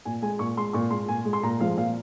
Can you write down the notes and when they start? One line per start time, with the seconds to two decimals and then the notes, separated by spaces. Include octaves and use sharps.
0.05 A#2 G#5
0.22 G#3 G#5
0.39 A#2 C#6
0.57 G#3 C6
0.73 A#2 C#6
0.91 G#3 C6
1.08 A#2 G#5
1.25 G#3
1.33 C6
1.43 A#2 A#5
1.60 F3 G#3 F5
1.77 A#2 F5